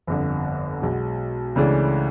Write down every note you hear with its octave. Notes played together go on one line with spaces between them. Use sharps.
G1 F2 D3
B1 B2 G#3
C#2 C#3 E3 A3 D4